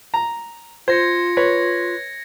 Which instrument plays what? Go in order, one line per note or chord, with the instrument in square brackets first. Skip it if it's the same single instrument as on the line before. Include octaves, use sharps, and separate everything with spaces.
[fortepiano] A#5
[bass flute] F4 [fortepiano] C5 [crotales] G#6 A#6 C#7
[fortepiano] B4 C#5